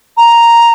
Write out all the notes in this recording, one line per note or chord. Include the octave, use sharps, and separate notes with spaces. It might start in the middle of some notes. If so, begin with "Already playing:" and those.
A#5